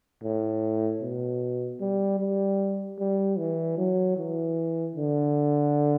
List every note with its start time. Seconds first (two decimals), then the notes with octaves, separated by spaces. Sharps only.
0.23 A2
1.02 B2
1.80 G3
2.20 G3
2.99 G3
3.38 E3
3.78 F#3
4.17 E3
4.95 D3